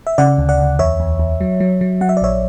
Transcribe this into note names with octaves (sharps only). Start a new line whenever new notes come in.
E5
C#3 D5 F#5
D2
D5 F#5
D2
E2 C#5 E5
E2
E2
F#3
F#3
F#3
F#3 F#5
E5
D5
A#1 C#5 E5